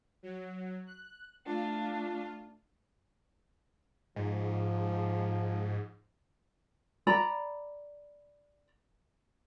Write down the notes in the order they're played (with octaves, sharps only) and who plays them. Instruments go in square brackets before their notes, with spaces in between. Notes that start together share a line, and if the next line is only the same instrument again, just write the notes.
[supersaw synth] F#3
F#6
[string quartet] A3 D4 [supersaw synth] F4
[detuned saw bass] G#2 [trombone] F3
[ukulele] D5 A#5 B5